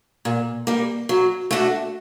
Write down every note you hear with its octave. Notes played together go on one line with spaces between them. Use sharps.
A#2
G3 A#3
F#3
A3 D4 F#4